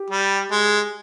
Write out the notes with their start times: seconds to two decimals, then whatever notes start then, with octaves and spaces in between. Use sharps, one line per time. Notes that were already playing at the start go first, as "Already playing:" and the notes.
Already playing: G4
0.10 G3
0.51 G#3